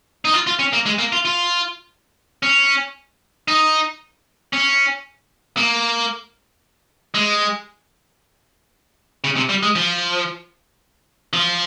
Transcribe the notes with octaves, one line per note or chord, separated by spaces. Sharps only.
D#4
F4
F4
C#4
A#3
G#3
A#3
F4
F4
C#4
D#4
C#4
A#3
G#3
C#3
C3
G3
G#3
F3
F3